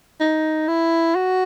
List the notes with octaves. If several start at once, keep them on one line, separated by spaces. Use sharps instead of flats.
D#4
E4
F#4